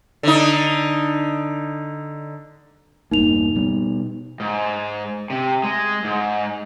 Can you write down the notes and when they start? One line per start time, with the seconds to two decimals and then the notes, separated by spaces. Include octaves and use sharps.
0.23 D3 D#4
3.11 E1 G2 A#3 D#4 F7
3.55 B2 G3 B3
4.40 G#2
5.30 C3
5.64 G#3
6.04 G#2